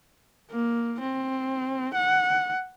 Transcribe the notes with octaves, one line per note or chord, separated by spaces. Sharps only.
A#3
C4
F#5